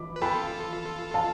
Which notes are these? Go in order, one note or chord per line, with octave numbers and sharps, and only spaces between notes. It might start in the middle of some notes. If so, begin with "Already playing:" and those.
Already playing: B5 D6
B4
F4 A4 G5 B5
F5 A5